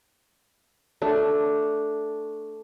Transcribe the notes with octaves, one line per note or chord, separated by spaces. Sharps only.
A3 D4